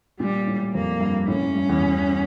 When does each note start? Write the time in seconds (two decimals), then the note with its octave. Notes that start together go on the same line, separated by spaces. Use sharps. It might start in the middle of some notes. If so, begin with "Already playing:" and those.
0.19 A#2 G3
0.47 A2
0.74 F2 A#3
1.01 G2
1.27 A2 C#4
1.42 A2
1.55 G2
1.69 E2
1.82 E2